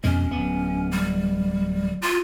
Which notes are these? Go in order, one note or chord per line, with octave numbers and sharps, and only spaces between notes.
F2 B2 G#3 C#4
D1 B3
G3
F4